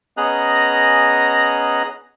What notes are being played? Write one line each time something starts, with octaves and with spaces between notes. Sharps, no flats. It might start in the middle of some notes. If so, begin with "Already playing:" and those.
B3 C#4 G#4 D#5 A#5 F#6